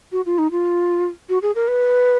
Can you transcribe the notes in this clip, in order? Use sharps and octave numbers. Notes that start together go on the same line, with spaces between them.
F#4
F4
D#4
F4
F#4
G#4
A#4
B4